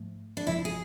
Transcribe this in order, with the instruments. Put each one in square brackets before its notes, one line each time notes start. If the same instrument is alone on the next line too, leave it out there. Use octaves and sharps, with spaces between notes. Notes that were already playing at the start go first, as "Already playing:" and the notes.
Already playing: [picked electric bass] G#2 F3 A3
[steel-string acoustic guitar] D4
[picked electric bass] F1 F2 C3 F3 [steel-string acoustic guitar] E4
[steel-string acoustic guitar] G#4